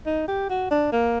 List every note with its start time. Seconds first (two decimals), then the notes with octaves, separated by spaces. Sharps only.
0.06 D#4
0.28 G4
0.50 F#4
0.71 D4
0.92 A#3